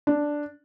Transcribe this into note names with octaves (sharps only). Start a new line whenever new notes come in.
D4